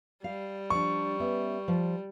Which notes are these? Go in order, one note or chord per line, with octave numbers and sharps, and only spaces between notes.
G3 G4 F5
F3 D4 C#6
B3 C#4 E5
F3